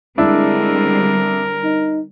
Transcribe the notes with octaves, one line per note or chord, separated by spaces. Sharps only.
D3 G3 G#3 C4 D4 E4 A#4
D#4